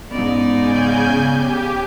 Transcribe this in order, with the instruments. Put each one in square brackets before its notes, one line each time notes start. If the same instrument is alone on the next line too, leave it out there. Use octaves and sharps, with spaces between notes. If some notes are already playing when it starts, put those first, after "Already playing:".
[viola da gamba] G#2 D#4 D5 [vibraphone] B3 C#4
[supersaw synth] C#3 G#5 G6
G4